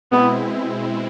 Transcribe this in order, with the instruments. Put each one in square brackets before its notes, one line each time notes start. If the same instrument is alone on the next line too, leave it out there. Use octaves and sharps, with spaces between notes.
[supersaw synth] B2 G#3 C4 E4 [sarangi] B3